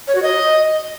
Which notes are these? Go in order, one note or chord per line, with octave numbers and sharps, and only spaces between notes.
C#5
F#4
D#5